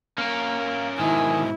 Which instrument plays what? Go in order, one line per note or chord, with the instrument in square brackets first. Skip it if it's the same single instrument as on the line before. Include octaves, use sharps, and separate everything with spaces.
[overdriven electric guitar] A#3 [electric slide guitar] C#4 A#4
[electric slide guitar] G#2 B2 [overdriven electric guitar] D#3 [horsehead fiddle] E4 [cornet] G#5